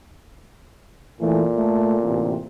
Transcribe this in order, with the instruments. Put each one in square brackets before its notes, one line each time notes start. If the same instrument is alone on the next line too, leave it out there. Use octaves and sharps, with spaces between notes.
[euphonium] A#2 [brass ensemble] E3 A3
[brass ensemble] A3
A1 D2 C3